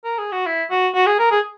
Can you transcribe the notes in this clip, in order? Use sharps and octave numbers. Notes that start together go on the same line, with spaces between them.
A#4
G#4
F#4
E4
F#4
F#4
G#4
A#4
G#4